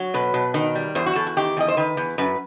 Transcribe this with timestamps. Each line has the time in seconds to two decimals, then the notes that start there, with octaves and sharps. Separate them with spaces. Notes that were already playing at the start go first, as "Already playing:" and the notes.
Already playing: F#3
0.14 B2 B4
0.34 B2
0.54 D#3
0.75 G3
0.95 E2 C5
1.06 F#4
1.15 E2 A4
1.27 F#4
1.37 D#3 G4
1.57 E2 D#5
1.68 C5
1.77 D#3 B4
1.97 E2
2.18 F#2 B4